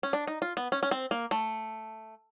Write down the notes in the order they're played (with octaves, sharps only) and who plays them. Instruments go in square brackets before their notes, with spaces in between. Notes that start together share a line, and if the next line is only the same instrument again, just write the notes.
[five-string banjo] C#4
D4
D#4
F4
B3
C#4
C#4
C4
A#3
A3